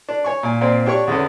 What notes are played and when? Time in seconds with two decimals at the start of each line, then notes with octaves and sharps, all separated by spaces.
0.09 D4
0.24 C#5 G#5 C#6
0.43 A#2 G#5
0.61 A#2 C4 D5
0.86 D4 G4 C#5 C#6
1.07 E2 D3 C#4